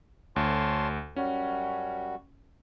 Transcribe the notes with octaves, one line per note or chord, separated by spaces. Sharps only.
D2 C#5 A5 C6
F#2 G3 C#4 F#4